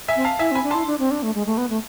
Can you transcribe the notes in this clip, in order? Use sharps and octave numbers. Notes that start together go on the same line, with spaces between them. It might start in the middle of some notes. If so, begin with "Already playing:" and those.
E5 G#5
C4
F5 A5
E4 E5 G#5
C4
G#5 B5
D4
E4 A5 C6
D4
C4
D4
A3
G#3
A3
B3
A3